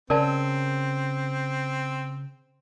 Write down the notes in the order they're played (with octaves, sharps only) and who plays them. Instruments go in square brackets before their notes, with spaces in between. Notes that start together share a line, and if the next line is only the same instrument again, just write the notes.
[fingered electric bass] C#3 [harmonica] C4 [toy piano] A#4 D5 A5